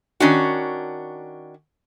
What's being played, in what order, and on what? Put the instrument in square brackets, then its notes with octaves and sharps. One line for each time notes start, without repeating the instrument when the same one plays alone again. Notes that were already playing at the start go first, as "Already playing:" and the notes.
[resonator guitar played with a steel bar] D#3 C#4 D4 F#4